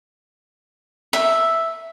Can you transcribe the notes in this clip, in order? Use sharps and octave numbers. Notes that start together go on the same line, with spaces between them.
E5